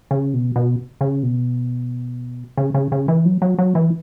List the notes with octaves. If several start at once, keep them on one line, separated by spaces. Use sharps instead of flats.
C#3
B2
B2
C#3
B2
C#3
C#3
C#3
E3
F#3
F#3
F#3
E3